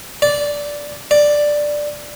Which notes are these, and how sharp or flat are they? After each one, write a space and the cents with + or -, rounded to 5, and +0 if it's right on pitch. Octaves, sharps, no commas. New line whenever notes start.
D5 -10
D5 +5